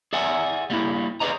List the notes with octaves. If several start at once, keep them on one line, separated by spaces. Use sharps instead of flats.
G#4 D5 E5 F#5 G#5
G3 A#3 E4
G#4 A4 B4 D5 D#5 A#5